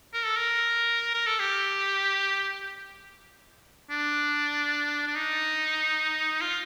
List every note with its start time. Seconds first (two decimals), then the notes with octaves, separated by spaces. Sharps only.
0.14 A#4
0.26 A4
0.37 A#4
1.14 A#4
1.27 A4
1.40 G4
3.91 D4
5.07 D4
5.16 D#4
6.42 F4